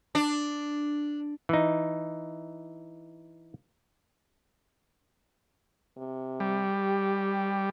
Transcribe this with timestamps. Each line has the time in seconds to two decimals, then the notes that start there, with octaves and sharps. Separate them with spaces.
0.15 D4
1.49 E3 D#4
5.97 C3
6.40 G3
6.76 G4